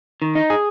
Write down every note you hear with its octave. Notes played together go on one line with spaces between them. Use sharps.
D#3
D#4
G#4